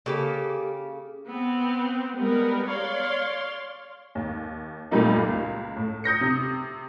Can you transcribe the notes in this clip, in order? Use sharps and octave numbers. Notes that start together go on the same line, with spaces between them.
C#3 A#3 G4 A4
B3 C4
G3 G#3 B3 A#4
C#5 D5 F5 C6
D#2
A#2 G3 A3 A#3 D#4
C#2
A2
D#6 G6 A#6 C#7
C3